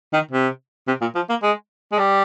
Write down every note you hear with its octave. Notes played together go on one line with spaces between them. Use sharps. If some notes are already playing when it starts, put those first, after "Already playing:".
D#3
C3
C3
A#2
F3
A#3
G#3
G#3
G3